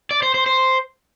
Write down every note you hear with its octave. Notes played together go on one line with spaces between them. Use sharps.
D5
C5
C5
C5